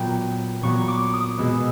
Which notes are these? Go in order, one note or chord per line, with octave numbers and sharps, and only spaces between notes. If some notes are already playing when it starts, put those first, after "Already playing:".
Already playing: A#2 F#3 B3 G5
A#2 F#3 B3 C#6
D6
D#6
B2 G#3 B3 E6